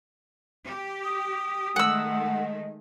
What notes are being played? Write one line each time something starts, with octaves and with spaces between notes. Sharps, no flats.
G4
D#6
D#3 G#3 A3 F#5 E6
D#5